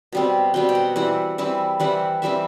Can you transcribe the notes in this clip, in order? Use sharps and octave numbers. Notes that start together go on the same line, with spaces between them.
B2 G3 C4
B2 G3 C4 G5
G5
F#5
E3 G3 C4 E4 F#5
E3 G3 C4 E4
E3 G3 C4 E4 F#5
E3 G3 C4 E4 E5